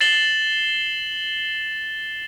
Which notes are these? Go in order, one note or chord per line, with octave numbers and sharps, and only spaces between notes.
A6 C7 E7 F#7 G7